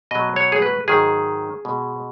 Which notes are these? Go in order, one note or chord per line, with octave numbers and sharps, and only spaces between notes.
B2 F#3 D#5
C#5
G#4
B4
G#2 D#3 F#3 G#4
B2 G#3